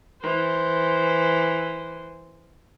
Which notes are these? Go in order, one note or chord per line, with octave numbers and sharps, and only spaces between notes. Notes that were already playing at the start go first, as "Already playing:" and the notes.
E3 C5